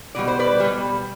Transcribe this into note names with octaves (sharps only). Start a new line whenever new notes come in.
B2 G3 D5
C5
B4 D5
B2 G3